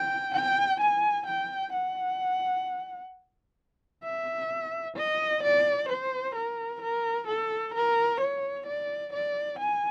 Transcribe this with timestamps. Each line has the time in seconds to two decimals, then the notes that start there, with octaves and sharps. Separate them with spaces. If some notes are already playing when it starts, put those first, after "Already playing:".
Already playing: G5
0.34 G5
0.81 G#5
1.26 G5
1.73 F#5
4.04 E5
4.97 D#5
5.43 D5
5.89 C5
6.36 A#4
6.82 A#4
7.28 A4
7.75 A#4
8.21 C#5
8.67 D5
9.13 D5
9.60 G#5